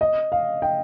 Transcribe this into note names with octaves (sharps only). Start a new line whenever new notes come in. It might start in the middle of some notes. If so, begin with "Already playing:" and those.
D#5
F5
G5